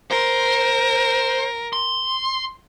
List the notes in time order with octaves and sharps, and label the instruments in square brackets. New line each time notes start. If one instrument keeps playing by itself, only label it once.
[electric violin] A#4 [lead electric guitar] C5
[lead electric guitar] C6